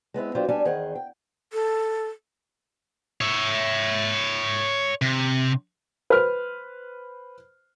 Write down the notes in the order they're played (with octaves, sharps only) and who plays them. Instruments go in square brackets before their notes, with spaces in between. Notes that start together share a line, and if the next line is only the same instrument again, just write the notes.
[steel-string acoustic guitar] G#3 B3 C4 E4
F#3 D4 F4 G4 C5
G3 D4 G#5 A5
E2 D#3 G#4 C5 F#5
G5
[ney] A4
[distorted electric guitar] C#5 E5
C3
[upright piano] B4 C5 F6